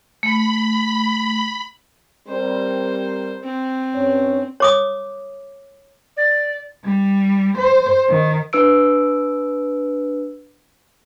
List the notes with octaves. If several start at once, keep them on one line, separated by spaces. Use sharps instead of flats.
A3 B5
G3 C4 A#4 C5
C4
G2 C#4 C#5
C#5 D6 D#6
D5
G3
C5
D#3
D4 B4 E6 D7